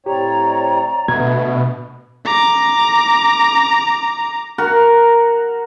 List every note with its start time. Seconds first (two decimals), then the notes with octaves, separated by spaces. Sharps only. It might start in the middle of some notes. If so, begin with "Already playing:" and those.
0.06 A2 C4 G4 C#5 D5 A#5
1.08 B2 D3 A3 B3 G#6
2.26 A#5 D6
4.58 F#4 A#4 F5